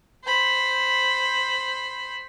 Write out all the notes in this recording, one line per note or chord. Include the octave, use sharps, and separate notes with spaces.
C5 B5